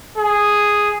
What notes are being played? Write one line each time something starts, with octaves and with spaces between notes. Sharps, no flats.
G#4